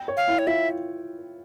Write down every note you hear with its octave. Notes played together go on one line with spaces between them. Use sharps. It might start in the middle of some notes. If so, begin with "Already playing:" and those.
Already playing: G5
C#5
F5
E4
C#5
F4 E5